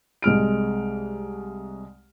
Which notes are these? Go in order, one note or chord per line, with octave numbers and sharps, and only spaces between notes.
C2 G#3 F6 D7